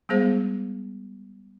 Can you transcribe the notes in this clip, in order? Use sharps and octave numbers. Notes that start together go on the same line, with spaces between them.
G3 G#3 B3 G#4 C5 F5